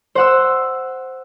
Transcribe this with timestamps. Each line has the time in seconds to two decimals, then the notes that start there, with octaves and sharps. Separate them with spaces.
0.15 C5 F#5 E6